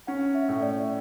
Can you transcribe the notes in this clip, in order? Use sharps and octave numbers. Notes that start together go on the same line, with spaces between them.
C#4 F#5
E5
A2
D5